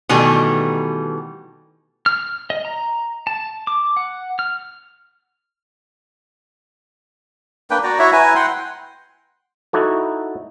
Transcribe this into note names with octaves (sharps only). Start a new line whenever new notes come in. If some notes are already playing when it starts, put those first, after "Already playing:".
B2 D#3 E3 G3 A3
F6
D#5
A#5
A5
D6
F#5
F6
A#3 D4 B4 G5
F#4 D5 A#5
E4 F#4 C#5 E5
E4 B4 G#5 A#5
F#5 G5 C6
D#4 E4 F#4 A4